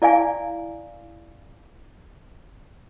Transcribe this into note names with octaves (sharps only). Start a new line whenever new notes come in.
E4 D5 F5 G#5